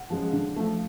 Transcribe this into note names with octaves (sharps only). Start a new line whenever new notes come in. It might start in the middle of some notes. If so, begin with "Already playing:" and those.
Already playing: F#5
F3 G#3 C#4
D3
F3 A3